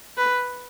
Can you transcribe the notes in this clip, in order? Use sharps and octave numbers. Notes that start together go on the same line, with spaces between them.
B4